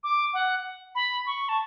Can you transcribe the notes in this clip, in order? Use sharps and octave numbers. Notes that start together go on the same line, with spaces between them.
D6
F#5
B5
C#6
A5